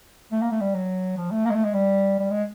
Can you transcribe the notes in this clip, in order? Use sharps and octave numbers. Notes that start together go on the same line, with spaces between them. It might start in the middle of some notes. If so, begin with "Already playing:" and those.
A3
A#3
A3
G3
F#3
F3
A3
A#3
G#3
A3
G#3
G3
G3
G#3